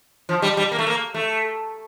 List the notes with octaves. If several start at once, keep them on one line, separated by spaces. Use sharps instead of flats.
F3
G3
G3
A#3
A3
A#3
A3